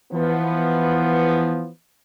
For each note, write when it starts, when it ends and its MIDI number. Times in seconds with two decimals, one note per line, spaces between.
0.12 1.69 52
0.12 1.69 53
0.12 1.69 59